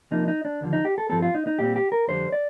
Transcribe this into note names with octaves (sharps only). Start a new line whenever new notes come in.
C2 C3 F3 A#3 D#4
D#4
D4
D#2 D3 F3
D#4
G4
A4
G2 F3 C4 A4
F4
D#4
D#4
A#2 G3 C4 G4
G4
A#4
F2 D3 G3 C5
D5